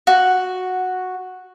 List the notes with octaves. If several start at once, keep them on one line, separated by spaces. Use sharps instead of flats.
F#4